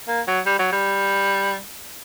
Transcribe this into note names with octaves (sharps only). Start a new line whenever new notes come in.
A#3
F#3
G3
F#3
G3